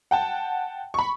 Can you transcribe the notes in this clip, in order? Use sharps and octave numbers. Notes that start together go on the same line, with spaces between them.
F#5 G5 A5
B5 C#6